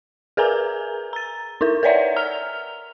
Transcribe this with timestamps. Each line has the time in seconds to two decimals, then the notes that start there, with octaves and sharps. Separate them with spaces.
0.37 G#4 A#4 B4 G#5 A#5
1.13 A#5 A6
1.61 D#4 E4 A#4
1.83 A#4 B4 C#5 D5 E5 F#5
2.16 A#5 F6 F7